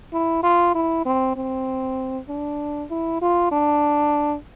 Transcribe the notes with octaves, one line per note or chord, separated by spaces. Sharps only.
E4
F4
E4
C4
C4
D4
E4
F4
D4